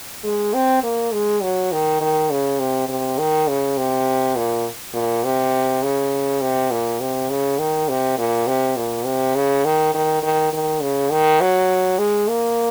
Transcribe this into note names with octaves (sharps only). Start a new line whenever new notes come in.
G#3
C4
A#3
G#3
F#3
D#3
D#3
C#3
C3
C3
D#3
C#3
C3
A#2
A#2
C3
C#3
C3
A#2
C3
C#3
D#3
C3
A#2
C3
A#2
C3
C#3
D#3
D#3
D#3
D#3
C#3
D#3
F#3
G#3
A#3